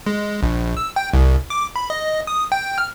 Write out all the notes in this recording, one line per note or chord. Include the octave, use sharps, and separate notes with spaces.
G#3
A#1
E6
G5
C2
D6
B5
D#5
D#6
G5
F6